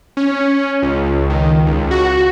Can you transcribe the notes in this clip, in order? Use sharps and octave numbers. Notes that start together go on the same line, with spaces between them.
C#4
C#2
D#3
C#2
F#4